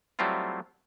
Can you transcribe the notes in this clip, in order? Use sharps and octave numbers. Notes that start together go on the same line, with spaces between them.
F#3 G3 A3 C4 E4 F4